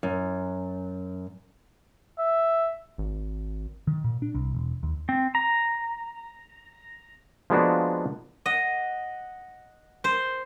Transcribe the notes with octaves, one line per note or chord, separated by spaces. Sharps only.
F#2
E5
G#1
D#3
A#2
D4
C2
E1
D#2
C4
A#5
F3 G#3 A#3 B3 D4 F#4
D#5 F#5
C5